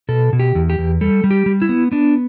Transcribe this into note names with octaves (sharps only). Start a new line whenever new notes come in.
B2 A4
B2
G4
E2
G4
E2
G3 A4
G3
G4
G3
E4
B3
B3 D4